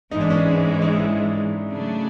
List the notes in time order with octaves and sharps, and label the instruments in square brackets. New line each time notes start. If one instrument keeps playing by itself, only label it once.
[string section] G#2 E3 G#3 [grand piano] D#4
[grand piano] D4
C#4
D4
D#4
E4
[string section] C#3 F#3 A3 D4